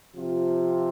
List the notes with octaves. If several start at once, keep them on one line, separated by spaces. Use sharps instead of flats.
C3 F3 C4 F4